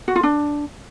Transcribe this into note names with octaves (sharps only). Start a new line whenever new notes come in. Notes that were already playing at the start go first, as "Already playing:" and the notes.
F#4
F4
D4